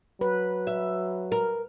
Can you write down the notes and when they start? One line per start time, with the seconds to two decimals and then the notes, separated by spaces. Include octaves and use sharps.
0.21 F#3 B4
0.67 E5
1.32 A#4